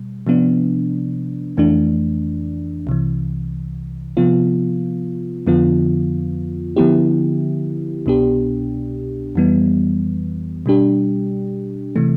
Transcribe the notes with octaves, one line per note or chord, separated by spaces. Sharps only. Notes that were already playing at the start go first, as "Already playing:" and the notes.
Already playing: B2 G3
C3 F3 B3 D4
F2 E3 A3 D4
C2 C3 E3
C3 F3 B3 F4
F2 D3 F3 B3 F4
D3 F3 B3 E4 G4
C2 B2 B3 D4 G4
F2 E3 G3 B3
B2 G3 D4 G4
C3 E3 A3